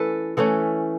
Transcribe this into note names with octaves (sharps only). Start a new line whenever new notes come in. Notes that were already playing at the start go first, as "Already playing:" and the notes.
Already playing: E3 A3 C#4 A4 B4
E3 A3 C#4 A4